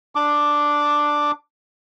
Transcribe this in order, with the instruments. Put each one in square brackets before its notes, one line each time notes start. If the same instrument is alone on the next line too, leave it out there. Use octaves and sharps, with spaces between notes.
[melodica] D4 D6